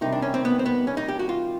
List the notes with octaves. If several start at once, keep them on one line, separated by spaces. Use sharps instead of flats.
C3 D#3 G3 D#4
D4
C#4
C4
B3
C4
B3
C#4
D#4
G4
F#4
F4